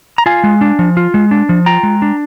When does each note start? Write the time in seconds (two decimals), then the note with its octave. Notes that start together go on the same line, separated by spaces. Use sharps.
0.18 A#5
0.26 F4 F5 G#5
0.44 G#3
0.61 D4
0.79 F3
0.97 F4
1.14 G#3
1.31 D4
1.49 F3
1.66 F4 G5 A#5
1.83 G#3
2.02 D4